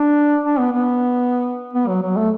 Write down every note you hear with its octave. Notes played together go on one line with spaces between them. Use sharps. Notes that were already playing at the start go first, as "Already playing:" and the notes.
Already playing: D4
D4
B3
B3
B3
F#3
F#3
A3